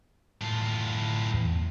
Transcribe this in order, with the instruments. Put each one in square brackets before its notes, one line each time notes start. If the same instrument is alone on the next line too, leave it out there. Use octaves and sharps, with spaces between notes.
[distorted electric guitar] A2 F4
[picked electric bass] E2